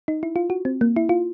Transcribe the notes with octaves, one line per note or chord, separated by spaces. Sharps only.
D#4
E4
F4
F#4
C4
A#3
E4
F4